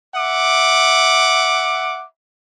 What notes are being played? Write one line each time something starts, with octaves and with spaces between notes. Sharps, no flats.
E5 F#5 D6